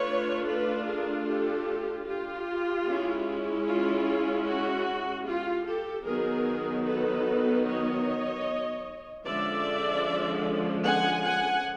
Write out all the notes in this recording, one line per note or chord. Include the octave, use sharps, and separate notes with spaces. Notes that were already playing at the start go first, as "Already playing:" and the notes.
Already playing: A3 D4 F4 B4 C#5
A4 B4
G#4 A#4
G4 A4
F4 G4
G#3 C#4 E4
F4
F#4
F4 G4
G4 A4
D#3 F#3 B3 D#4 G#4 A#4
A4 B4
C#5 D#5
D3 F3 G#3 C#4 D5 E5
F#5 G#5
F#5 G#5